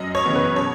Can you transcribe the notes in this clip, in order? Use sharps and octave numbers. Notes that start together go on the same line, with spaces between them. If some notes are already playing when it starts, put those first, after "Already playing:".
Already playing: F#2 D#5
C#5
C#3 E3 B3
B4
B2 C#5